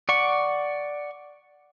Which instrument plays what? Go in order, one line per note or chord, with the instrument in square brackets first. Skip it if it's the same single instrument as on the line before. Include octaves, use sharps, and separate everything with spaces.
[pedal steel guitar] D5 F#5 C#6